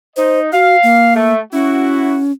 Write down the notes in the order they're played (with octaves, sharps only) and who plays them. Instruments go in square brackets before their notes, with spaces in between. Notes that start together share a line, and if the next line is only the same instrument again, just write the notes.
[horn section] D#4 D#5 [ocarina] C5
[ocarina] F#4 [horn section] F5
[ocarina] A#3
[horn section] A3
[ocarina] C#4 [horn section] E4 F#4